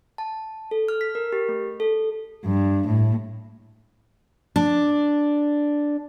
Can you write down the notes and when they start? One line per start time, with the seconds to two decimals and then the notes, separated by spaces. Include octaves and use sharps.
0.18 A5
0.71 A4
0.88 F6
1.01 B6
1.15 A#4
1.33 G4
1.49 A3
1.80 A4
2.45 G2
2.87 A2
4.56 D4